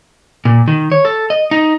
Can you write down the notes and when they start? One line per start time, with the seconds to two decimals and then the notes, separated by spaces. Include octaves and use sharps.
0.45 A#2
0.68 D#3
0.92 C#5
1.05 A4
1.30 D#5
1.51 D#4